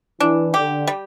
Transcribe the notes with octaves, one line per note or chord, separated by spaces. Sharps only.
E3 D4
D3 G4
G3